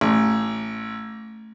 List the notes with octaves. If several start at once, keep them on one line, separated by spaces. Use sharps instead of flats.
A1 A3